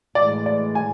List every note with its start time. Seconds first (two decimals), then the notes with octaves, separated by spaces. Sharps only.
0.15 A2 E3 G#3 D5
0.46 D5
0.75 G#5